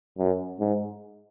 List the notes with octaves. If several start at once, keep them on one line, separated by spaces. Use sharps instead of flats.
F#2
G#2